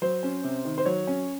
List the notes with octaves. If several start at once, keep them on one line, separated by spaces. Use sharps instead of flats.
F#3 C5
C#4
C3
D#3
C5
F#3 C#5
C#4